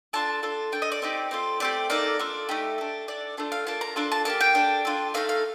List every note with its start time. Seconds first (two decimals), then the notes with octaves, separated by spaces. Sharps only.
0.13 D4 F4 A4 A5
0.43 D4 F4 A4
0.72 D4 A4 G5
0.82 D#5
0.92 D5
1.02 C4 D#4 G4
1.31 C4 F4 A4
1.60 A3 C4 G4 D5
1.90 A#3 D#4 A4 D5
2.19 D4 F4 A4
2.49 A3 D#4 G4
2.78 D4 A4
3.08 D4 A4 D5
3.37 A3 D4 F4
3.52 F5
3.66 A#3 D4 F4 A5
3.81 A#5
3.96 D4 F4 A4 A5
4.12 A5
4.25 A#3 D4 G4 A5
4.41 G5
4.55 D4 A4
4.85 D4 F4 A4
5.14 A3 C4 D#4 A4 F5
5.29 F5